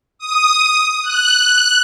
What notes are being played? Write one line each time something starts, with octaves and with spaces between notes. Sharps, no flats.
D#6
F#6